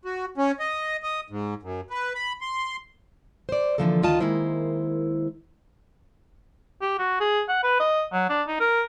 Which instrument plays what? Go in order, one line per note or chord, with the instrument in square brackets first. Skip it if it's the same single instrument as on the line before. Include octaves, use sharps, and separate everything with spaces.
[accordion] F#4
C#4
D#5
D#5
G#2
F#2
B4
B5
C6
[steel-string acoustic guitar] C5 D5
D3 E3 F3 A#3 A4
D2 D#3 F4 D#5 A5
D#3 G#3 A#3 E4 C5
[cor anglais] G4
F#4
G#4
F#5
B4
D#5
F#3
D4
D#4
A#4